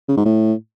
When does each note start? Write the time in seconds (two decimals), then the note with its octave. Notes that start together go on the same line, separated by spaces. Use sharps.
0.08 C#3
0.17 G#2
0.25 A2